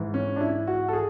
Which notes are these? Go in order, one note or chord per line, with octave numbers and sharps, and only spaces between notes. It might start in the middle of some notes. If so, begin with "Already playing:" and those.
Already playing: G#2 E3
C#4
D4
E4
F#4
A4
G#4